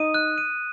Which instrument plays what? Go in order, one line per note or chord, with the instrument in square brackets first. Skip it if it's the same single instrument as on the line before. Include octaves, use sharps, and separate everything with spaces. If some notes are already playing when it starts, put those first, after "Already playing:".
Already playing: [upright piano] D#4 [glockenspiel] D#6 D#7
[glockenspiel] F#6
D#7